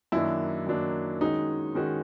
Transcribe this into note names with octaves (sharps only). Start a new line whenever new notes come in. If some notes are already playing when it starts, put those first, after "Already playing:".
F#2 D#3 F#3 A#3 D4 E4
F#2 D#3 F#3 A#3 D4
D#3 G#3 C#4 D#4 F#4
D#3 G#3 C#4 F#4